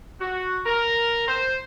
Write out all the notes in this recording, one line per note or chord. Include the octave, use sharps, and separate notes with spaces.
F#4
A#4
C5